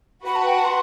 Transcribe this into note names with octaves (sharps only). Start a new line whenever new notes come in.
F#4 B4 F#5 B5
A5
G5
A5
C6